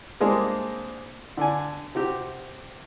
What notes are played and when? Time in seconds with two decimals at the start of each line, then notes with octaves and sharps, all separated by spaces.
0.20 G3 G#3 A#3 C4 D4 G#4
1.37 D3 D5 G#5
1.95 C3 F#4 G4